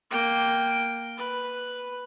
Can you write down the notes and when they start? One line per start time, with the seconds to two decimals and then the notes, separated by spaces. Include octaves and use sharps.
0.11 A#3 G5
1.17 B4